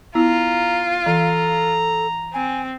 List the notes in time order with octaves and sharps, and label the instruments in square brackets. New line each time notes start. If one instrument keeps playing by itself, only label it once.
[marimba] B3 E4 E6 [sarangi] F4 [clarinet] A#5
[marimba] E3 [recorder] A4 [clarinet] A#5
[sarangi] C4 [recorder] G#5